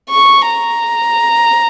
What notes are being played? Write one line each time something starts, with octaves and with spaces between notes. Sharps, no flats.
C#6
A#5